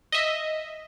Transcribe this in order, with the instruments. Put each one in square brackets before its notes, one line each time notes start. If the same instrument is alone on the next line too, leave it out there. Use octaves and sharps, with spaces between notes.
[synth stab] D#5 E5